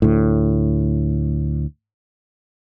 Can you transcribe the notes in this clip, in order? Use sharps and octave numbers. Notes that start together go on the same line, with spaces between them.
D2 A2